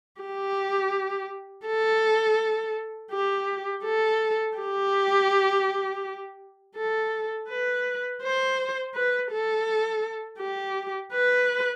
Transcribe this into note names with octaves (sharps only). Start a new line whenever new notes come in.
G4
A4
G4
A4
G4
A4
B4
C5
B4
A4
G4
B4